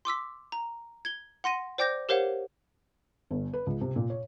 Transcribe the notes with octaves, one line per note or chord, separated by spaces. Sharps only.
C6 D6 E6 B6
A#5
G#6 G7
F#5 C6 A#6 D#7
C5 D5 G5 D6 G6 A#6
G4 A#4 C5 C#5 F5 F#5
G1
B4
C#2
C3
A#2
C#5